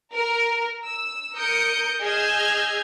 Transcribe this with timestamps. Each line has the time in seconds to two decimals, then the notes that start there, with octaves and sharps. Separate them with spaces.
0.13 A#4
0.85 E6
1.36 A#4 D#6 G6 C#7 D7
2.01 G#4 D#5 E6 F6 G6 G#6